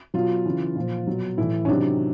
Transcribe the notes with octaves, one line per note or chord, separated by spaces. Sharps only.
B2 F#3 F4
C#3 E3
A#2 F3
B2 F#3
A2 E3 E4
C#4
C3 D#3 F#3 D4